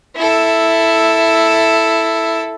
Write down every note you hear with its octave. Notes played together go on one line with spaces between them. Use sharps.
E4 A4